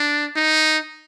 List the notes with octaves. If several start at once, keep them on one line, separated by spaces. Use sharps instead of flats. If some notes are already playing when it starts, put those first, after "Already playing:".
Already playing: D4
D#4